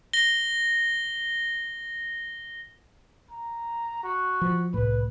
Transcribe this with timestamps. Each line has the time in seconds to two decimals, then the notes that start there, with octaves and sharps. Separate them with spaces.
0.13 A#6 G7
3.31 A#5
4.03 F#4
4.41 F3
4.74 C2 A2 B4